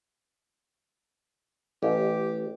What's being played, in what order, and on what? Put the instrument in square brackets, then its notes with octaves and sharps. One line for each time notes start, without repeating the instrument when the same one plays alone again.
[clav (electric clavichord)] A1 [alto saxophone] G4